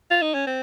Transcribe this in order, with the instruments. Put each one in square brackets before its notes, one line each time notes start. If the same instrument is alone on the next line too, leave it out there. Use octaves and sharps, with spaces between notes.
[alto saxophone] F4
D#4
C#4
C4